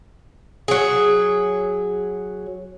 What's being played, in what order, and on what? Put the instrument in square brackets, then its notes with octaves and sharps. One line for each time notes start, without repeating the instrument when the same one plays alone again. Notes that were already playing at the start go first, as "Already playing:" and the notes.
[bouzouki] F#3 G#4